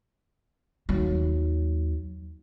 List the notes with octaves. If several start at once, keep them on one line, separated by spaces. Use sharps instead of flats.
D#2 F#3